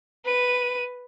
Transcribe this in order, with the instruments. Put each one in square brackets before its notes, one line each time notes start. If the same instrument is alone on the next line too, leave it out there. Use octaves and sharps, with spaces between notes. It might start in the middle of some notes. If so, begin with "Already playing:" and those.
[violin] B4 D#7